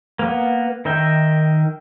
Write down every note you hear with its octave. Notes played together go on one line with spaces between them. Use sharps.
A#3 B3
D#3 A#4 E5 G5